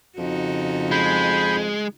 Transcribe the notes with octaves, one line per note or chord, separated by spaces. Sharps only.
F2 C#3 D#4 F#4
G#3 B5 G6